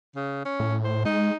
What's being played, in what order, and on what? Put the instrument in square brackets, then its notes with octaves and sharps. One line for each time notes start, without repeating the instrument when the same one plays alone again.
[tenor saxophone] C#3
C#4
[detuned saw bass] A2
[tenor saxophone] C5
[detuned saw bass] G#3 [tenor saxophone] D#4